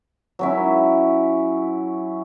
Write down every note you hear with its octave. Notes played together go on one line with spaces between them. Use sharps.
F#3 C#4 E4